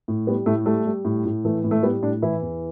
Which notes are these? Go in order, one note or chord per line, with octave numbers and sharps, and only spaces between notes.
A2
G3 B3
A2 A3
G3 A3
G3
A2
A2
E3 A3
A2
A3
G3 B3
A2 D4
E3 E4
E2